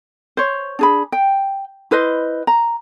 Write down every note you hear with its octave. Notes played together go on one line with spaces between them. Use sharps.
C5 C#5
D4 G#4 B5
G5
E4 B4 C5 D#5
A#5